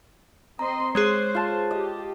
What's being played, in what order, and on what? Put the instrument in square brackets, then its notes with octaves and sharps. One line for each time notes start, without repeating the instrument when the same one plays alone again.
[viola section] C4 D#5 C6 [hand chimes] A#5
[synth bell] G#3 G#4 [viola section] C5 [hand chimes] C#5 F#6 C7
[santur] F4 A5
[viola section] G4 [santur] D#5